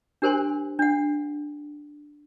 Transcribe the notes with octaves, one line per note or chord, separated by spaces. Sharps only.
D4 G4 A#4 C5 G#5 C6
D4 F#5